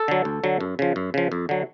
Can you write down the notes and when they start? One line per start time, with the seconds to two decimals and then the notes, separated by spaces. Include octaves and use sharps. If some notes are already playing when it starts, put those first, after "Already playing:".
Already playing: A4
0.08 D3 F#3
0.25 D2
0.44 D3 F#3
0.61 F#2
0.79 C#3 F3
0.96 F#2
1.14 C#3 F3
1.32 F2
1.49 D3 F#3